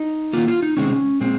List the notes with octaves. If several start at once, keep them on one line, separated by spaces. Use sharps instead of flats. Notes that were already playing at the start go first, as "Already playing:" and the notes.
Already playing: D#4
D#3 A#3 F4
F4
D#4
C3 D#3 G#3 C4 C#4
A#2 G#3 C4